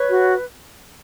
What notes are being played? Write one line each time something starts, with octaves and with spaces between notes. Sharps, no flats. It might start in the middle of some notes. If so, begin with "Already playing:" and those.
Already playing: B4 C#5 C#6
F#4